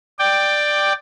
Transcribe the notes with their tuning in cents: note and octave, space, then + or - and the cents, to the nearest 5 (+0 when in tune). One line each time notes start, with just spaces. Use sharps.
D5 +10 G5 +0